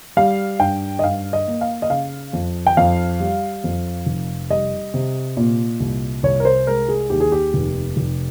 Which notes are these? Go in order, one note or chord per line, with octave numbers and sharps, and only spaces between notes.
G3 F5
G2 G5
D#5
G2 F5
D#5
A#3
F5
D#5
C#3 F5
F2
G5
F2 F5
G3
F2
F1
G3 D#5
C3
A#2
C2
C2 C#5
A#4
C5
G#3 A#4
G#4
D#2 G4
G#4
G4
F1
F1